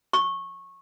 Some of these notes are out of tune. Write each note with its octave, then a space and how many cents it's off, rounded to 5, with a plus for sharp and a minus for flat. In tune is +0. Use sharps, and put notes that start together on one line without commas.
C#6 -15